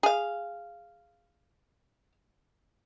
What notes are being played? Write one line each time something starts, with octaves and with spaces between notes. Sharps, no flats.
G#4 F5